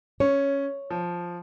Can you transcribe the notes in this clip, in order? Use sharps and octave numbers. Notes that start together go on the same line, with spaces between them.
C#4 C#5
F3